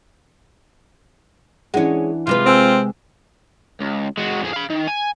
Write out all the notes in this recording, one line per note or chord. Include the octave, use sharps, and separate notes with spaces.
E3 G#3 C#4 D4 F#5
C3 G#3 F4 B4
C4 G5 G#5 E6
C#2
G#3 F#4
F2 G#4
F5 B5
D#3
G#5